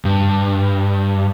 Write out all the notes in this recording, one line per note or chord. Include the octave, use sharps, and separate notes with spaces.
G2